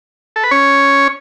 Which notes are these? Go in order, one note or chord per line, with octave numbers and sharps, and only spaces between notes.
A4
B4
C#4 C#5